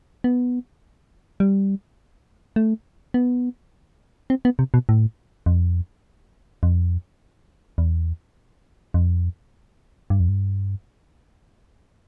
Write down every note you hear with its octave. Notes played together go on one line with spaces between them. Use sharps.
B3
G3
A3
B3
C4
B3
C3
B2
A2
F2
F2
E2
F2
G2
F2
G2